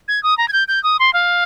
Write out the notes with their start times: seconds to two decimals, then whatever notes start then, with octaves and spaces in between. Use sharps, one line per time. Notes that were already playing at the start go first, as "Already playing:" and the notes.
0.08 G#6
0.23 D#6
0.38 A#5
0.48 G#6
0.53 G6
0.68 G6
0.83 D#6
0.99 C6
1.13 F5